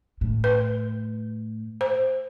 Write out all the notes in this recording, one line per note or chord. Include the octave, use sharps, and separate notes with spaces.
A2
B4
C5